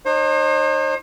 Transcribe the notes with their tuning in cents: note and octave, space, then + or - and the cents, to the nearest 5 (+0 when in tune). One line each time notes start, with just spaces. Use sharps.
D#4 -35 C5 +40